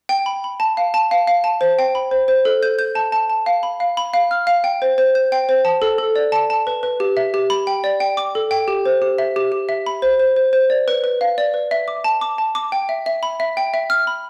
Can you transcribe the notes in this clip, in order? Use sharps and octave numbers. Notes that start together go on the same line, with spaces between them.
G5
B5
B5
A5
F5
A5
F5
F5
A5
C5
G5
B5
C5
C5
A4
G6
G6
A5
A5
A5
F5
B5
F5
B5
F5
F6
F5
G5
C5
C5
G6
G5
C5
A5
A4
A4
D5
A5
A5
B4
B4
G4
E5
G4
B5
G5
D5
G5
D6
A4
G5
G4
C5
G4
E5
G4
G4
E5
B5
C5
C5
C5
C5
D5
B4
B4
F5
D5
B4
E5
D6
A5
D6
A5
D6
G5
E5
E5
B5
E5
G5
E5
F6
B5